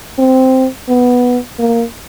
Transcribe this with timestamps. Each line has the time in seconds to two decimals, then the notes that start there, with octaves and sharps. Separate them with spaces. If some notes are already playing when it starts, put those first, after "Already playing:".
0.18 C4
0.89 B3
1.59 A#3